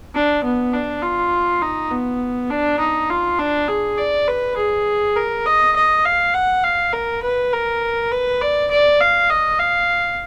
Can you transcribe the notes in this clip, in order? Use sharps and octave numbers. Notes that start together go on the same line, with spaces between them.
D4
B3
D4
F4
D#4
B3
D4
D#4
F4
D4
G#4
D5
B4
G#4
A#4
D#5
D#5
F5
F#5
F5
A#4
B4
A#4
B4
D5
D5
F5
D#5
F5